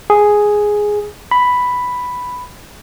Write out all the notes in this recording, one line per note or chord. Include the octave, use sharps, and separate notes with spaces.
G#4
B5